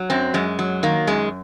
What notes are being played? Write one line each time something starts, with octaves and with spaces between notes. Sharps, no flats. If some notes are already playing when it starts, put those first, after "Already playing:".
Already playing: F#3
F#2 C4
F#2 G#3
F#3
D#3 A#3
F#2 G#3